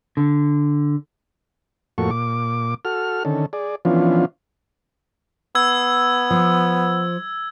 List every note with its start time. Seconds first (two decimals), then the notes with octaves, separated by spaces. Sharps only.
0.17 D3
1.98 F2 A2 A#3 F#4 A4 C#6
2.11 A#2 D6
2.85 F#4 A4 F6
3.25 D3 D#3 C#4 A4
3.53 G#4 D5
3.85 E3 F3 B3 C#4 D4 F4
5.55 B3 E6 G#6
6.31 F3